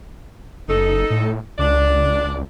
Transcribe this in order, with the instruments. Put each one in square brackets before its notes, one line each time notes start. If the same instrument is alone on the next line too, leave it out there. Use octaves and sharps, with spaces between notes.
[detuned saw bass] F#1 [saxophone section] D#4 A4
[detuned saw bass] A2
[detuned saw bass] C#2 [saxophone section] D4 D5